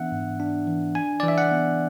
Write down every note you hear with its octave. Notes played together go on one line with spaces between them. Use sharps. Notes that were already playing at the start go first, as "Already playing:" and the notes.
Already playing: E3 B3 D4 E5 F#5
G#2
D4
E3
D4 G#5
E3 D5
E5
F#5
B3